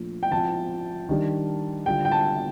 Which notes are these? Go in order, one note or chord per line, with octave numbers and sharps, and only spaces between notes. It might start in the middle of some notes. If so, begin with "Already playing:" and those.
Already playing: A#2 F3 A3 D4 F4
G5
F3 C4 F4 A5
D#3 G3 D4
D3 G3 D4 F4 G5
G5
A5